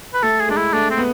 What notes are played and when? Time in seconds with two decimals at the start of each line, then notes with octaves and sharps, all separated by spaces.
0.14 B4
0.23 A3 A4
0.39 G#4
0.49 G#3 D4
0.57 E4
0.73 A3 D4
0.90 C4
0.98 B3